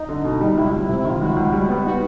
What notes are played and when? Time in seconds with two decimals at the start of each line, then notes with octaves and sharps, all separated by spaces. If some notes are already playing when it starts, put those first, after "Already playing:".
Already playing: D#4
0.09 D3
0.24 B2
0.41 G3
0.57 C#2 E4
0.73 C#2
0.89 C3 E4
0.99 E4
1.05 D#3
1.10 F4
1.21 C#2 F#4
1.36 C#2
1.53 G3
1.69 B3
1.84 D#4 F#4